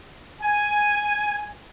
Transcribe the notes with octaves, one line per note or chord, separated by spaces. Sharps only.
G#5